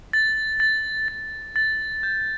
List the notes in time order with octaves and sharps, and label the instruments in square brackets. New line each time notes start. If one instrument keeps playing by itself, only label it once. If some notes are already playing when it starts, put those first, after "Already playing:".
[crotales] A6
A6
A6
A6
G6